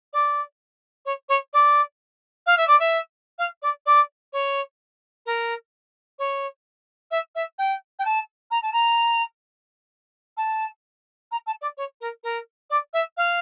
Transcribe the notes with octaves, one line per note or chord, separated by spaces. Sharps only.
D5
C#5
C#5
D5
F5
E5
D5
E5
F5
D5
D5
C#5
A#4
C#5
E5
E5
G5
G5
A5
A#5
A5
A#5
A5
A#5
A5
D5
C#5
A#4
A#4
D5
E5
F5